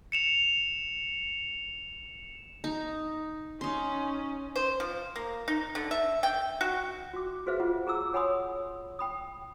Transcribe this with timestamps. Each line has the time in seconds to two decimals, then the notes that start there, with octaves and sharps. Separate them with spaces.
0.12 C#7 E7 F7
2.64 D#4
3.61 C#4 D#4 C6
4.56 C5
4.80 F3
5.16 A#3
5.48 D#4
5.75 D3
5.91 E5
6.23 G5
6.61 F#4
7.13 F#4 D6
7.46 F#4 G#4 B4 C5 E5 F5
7.60 F4 F#5
7.87 G#4 A#5 D6 E6
8.14 C#5 F#5 G#5 B5 C6 D#6
8.99 G5 B5 D#6